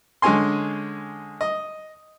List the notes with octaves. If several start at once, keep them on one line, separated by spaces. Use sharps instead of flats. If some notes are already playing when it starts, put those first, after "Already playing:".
D3 G#3 C#4 G#5 C6
D#5